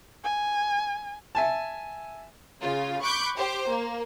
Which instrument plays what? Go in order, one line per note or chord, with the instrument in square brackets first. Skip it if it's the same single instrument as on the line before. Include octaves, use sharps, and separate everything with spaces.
[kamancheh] G#5
[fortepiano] E5 G#5 A5
[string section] C#3 F4
B5 C#6 D6 F#6 G6
G4 C5
A#3